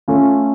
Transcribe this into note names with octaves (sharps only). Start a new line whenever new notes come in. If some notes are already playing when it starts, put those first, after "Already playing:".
A3 C#4 F4